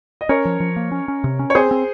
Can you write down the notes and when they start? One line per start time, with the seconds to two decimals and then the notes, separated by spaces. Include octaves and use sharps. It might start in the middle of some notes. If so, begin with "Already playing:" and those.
0.21 D#5
0.29 C#4 A#4 C#5
0.45 F3
0.60 F3
0.76 A#3
0.92 C#4
1.08 C#4
1.24 C3
1.39 C#4
1.50 C#5
1.55 C4 G#4 C5
1.71 C4